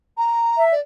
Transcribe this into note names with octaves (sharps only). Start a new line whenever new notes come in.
A#5
E5
D5